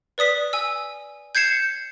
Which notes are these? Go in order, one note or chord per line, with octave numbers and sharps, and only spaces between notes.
B4 D5 D#6 B6
G#5 E6
G6 G#6 C7 C#7 E7